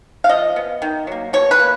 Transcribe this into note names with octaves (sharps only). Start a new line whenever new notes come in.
F5
F3 D#5
B3
D#3
F#3 A#3
B2 C#5
B4
A#3